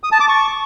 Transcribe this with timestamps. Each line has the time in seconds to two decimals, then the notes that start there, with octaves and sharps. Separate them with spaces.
0.03 D#6
0.12 A5
0.20 D6
0.29 C#6